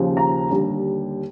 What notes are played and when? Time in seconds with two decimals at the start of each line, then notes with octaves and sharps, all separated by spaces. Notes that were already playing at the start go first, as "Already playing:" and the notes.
Already playing: D#2 C#3 F3
0.17 A#5
0.51 D#2 D3 G3